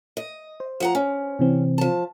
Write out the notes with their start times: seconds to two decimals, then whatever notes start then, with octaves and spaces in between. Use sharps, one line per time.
0.17 D#5
0.60 C5
0.80 F3 F#5 A#5
0.95 C#4
1.39 C3 E3 C4
1.78 F3 A5